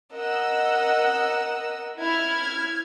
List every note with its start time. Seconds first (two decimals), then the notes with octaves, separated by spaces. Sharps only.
0.14 A#4 D#5 F#5 E6
2.00 E4 F6 G#6